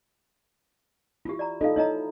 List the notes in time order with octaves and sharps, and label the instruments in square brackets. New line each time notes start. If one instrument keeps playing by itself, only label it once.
[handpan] E4 [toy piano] F4 G4
[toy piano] D5 A#5
[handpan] D#4 A4 D#5 [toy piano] F4 F5
[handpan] D#4 E4 [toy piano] C#5 D#5 A#5